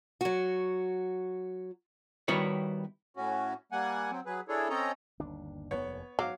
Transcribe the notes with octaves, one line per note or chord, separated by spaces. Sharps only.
F#3 F#4
D#3 G3 B3 E4 F#4 C#5
A2 C#4 F#4
G3 A#3 F#5 G#5
F#3 C4
F#3 G#4 B4
D4 E4 G#4 A4 C#5
C4 C#4 A4 C#5 D#5 A#5
G1 D#2 D4
F1 D#2 B3 C#5
G#2 F#3 F5 D6